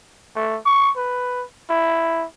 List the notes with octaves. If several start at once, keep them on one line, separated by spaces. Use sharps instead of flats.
A3
C#6
B4
E4